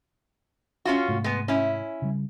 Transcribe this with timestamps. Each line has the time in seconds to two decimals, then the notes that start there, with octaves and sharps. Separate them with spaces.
0.85 C#4 F4 F#4
1.08 G#2 C3 A3
1.24 G#3 B3
1.48 C#4 E4
2.02 C#3 G3